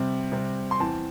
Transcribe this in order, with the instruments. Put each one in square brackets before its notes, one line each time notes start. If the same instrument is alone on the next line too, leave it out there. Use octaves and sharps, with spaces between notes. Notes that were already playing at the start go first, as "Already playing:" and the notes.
Already playing: [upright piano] C3 G3 C4
C3 G3 C4
C6
E2 E3 C4 A5